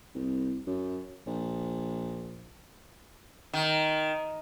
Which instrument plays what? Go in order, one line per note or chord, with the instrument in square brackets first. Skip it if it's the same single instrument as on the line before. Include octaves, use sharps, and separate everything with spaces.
[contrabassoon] C2
F#2
A#1
[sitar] D#3